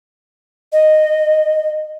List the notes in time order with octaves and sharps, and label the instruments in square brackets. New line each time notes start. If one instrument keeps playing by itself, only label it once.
[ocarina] D#5